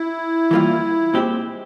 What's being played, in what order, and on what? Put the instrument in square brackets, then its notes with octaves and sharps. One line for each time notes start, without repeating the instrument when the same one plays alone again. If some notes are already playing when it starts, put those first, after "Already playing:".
Already playing: [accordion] E4
[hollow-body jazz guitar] E3 G3 A#3 F4
A#2 G#3 C4 G4